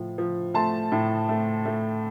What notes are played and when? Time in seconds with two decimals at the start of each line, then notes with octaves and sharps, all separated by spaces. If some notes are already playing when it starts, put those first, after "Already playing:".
Already playing: A2 F3 A3
0.18 F3
0.54 A3 A5 C6
0.92 A2
1.29 A3
1.65 A3